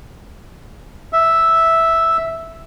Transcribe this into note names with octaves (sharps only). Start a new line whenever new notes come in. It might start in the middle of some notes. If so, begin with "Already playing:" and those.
E5